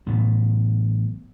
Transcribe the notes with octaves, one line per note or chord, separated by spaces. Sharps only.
A1 A2 F#3 B3